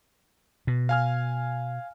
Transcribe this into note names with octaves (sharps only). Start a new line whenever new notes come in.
B2
F5 G#5 F6